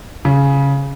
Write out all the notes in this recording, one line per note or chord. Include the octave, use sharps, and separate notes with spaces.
C#3